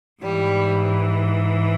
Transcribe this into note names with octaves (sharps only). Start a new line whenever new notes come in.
G#2 E3 G3